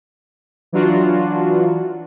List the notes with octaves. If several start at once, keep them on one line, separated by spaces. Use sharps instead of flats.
E3 F#3 D4 F4 F#4